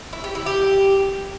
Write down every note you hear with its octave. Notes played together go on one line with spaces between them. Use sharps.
E4
G4
E4
G4